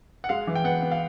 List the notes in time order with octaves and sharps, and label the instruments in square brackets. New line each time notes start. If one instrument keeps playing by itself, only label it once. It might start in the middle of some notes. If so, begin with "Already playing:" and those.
[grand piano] F#5
[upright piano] G#3 [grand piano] F5
[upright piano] E3
[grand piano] G5
[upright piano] B3 [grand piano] F#5
[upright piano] B3
[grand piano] F5